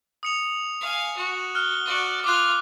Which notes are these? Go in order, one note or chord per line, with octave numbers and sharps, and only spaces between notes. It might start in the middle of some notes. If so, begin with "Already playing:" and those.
D#6 C#7 F7
F5 G#5
F#4
F6 F#6 G7
F#4 D5
F4 D6 F6 F#6